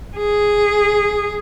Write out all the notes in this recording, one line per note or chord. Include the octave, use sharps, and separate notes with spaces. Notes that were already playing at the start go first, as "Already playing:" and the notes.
G#4